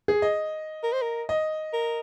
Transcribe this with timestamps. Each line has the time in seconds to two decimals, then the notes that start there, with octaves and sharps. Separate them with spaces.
0.08 G#4
0.22 D#5
0.83 A#4
0.93 C5
1.02 A#4
1.29 D#5
1.73 A#4